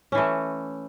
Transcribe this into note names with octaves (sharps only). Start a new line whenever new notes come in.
E3 A3 C#4